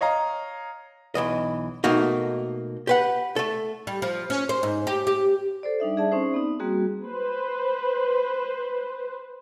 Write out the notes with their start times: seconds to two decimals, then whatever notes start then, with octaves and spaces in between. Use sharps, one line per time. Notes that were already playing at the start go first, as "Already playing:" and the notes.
0.01 C#5 D#5 F5 A#5
1.15 B1 E3 D#5
1.84 B2 A3 A#3 D#4 F#4
2.87 G4 B4 F#5
3.36 A3 A4
3.87 G3
4.02 F3
4.30 C#4
4.49 C5
4.63 G#2
4.87 G4
5.07 G4
5.63 A4 C5 D5
5.80 G3 D4 D#4 E5
5.97 G#4 D5 E5 A5
6.12 C4 C#4 D#4 C5
6.34 B3 C4 D#4
6.60 G3 A#3 C4 F#4 G#4
7.03 B4 C5